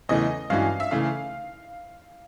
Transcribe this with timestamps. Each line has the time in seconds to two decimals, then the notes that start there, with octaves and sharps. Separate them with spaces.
0.09 E2 C#3 E3 A3 D#5
0.50 G2 E3 G#3 C#4 F#4 F5
0.80 E5
0.91 C#3 E3 A3 F5